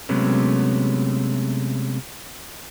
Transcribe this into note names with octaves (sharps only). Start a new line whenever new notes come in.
C3 F#3 G#3 A3 B3 C#4